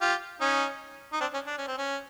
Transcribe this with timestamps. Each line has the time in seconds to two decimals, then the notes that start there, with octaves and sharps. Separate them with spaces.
0.01 F4 G4
0.41 C#4 D#4
1.13 D#4
1.21 C4 D4
1.34 C#4
1.47 D4
1.57 C#4
1.67 C4
1.78 C#4